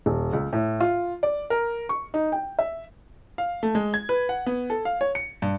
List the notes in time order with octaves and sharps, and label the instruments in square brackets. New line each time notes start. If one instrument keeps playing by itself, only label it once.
[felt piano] D#1
C#2
A2
F4
D5
A#4
C#6
D#4
G5
E5
[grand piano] F5
A3
G#3
G#6
B4
F#5
B3
A4
F5
C#5
C#7
G2